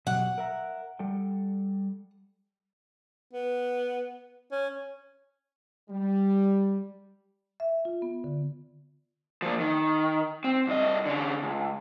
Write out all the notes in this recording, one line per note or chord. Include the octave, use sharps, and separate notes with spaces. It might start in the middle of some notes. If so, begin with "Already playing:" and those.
B2 F#3 G4 F#5
A#4 E5 A#5
G3 A4 G5
B3
C#4
G3
E5
F4
B3
D3
F3 A#3
D#3
C4
C2 D#5
D3 C#4
C#2